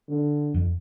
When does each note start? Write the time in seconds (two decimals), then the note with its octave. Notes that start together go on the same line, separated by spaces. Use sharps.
0.08 D3
0.54 F2